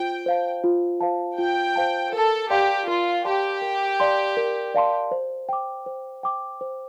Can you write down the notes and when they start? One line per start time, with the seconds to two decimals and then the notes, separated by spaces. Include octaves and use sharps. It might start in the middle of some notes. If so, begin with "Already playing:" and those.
Already playing: F4 C5 G5
0.26 C5 F5 A5
0.64 F4
1.01 C5 F5 A5
1.38 F4 G5
1.76 C5 F5 A5
2.13 A4 A#4
2.50 G4 D5 F5 A5 C6
2.87 F4 A#4
3.25 G4 D5 F5 A5 C6
3.62 A#4
4.00 D5 F5 A5 C6
4.37 A#4
4.74 D5 F5 A5 C6
5.11 C5
5.49 G5 D6
5.86 C5
6.23 G5 D6
6.61 C5